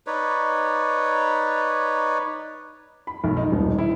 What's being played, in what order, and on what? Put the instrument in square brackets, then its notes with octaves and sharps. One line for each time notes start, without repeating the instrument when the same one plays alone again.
[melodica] D#4 B4 C#5 D5
[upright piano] B5
B1
D#4
D#1
E4